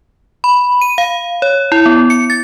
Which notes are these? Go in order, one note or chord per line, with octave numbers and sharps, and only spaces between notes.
B5
D#7
F5
C#5
E4
B3
C#7
A6